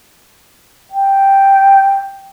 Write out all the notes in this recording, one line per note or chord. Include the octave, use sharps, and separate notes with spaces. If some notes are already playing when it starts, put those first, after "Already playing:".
G5